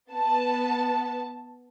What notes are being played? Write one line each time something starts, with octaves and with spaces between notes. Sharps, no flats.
B3 A5